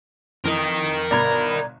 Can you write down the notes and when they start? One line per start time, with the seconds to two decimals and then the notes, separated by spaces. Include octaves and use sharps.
0.45 F2 E3 A#4 D#5
1.11 G1 B2 D5 A#5 B5 G#6